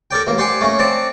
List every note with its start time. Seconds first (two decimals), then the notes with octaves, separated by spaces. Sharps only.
0.11 A4 A#4 D5 G5
0.27 A1 A#3
0.38 G4 C5 D5 F#5 G#5
0.61 A3 A#3 C#4
0.79 C4 D5 F#5 A5